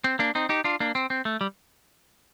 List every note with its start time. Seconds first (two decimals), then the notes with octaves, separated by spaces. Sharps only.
0.04 C4
0.19 A#3 D4
0.35 C4 D#4
0.49 D#4 G4
0.64 D4 F4
0.80 A#3 D4
0.95 C4
1.10 C4
1.25 A3
1.41 G3